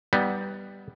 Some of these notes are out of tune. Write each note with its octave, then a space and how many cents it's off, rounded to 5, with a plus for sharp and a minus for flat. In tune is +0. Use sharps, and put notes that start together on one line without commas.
G3 +0 B3 +0 D#4 +30